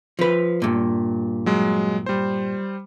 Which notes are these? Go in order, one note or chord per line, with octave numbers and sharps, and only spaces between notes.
F3 B4
G2 A#2
F#3 G#3
G3 C5